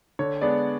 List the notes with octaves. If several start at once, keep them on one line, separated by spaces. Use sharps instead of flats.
D3 C#5
G#3 B3 D4 D5